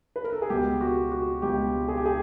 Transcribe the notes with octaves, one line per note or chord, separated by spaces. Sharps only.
B4
A#4
A4
G#4
C#2 B2 G#3 G4
F#4
F#4
C#2 B2 G#3 G4
G#4
G4
G#4